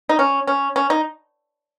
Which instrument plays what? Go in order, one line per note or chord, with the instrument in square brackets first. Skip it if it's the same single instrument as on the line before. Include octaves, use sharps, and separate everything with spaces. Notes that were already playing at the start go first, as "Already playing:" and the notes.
[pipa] D#4
C#4
C#4
C#4
D#4